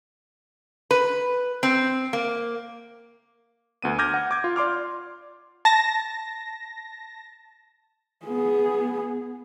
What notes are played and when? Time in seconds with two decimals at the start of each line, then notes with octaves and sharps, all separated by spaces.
0.91 B4
1.63 C4
2.13 A#3
3.82 D2 B3 D#7
3.99 D6 F6 G6 G#6 A#6 D#7
4.14 F#5
4.31 D6 G#6
4.44 F4
4.56 D5 C6 D6 F6
5.65 A5 A#6
8.26 B3 G#4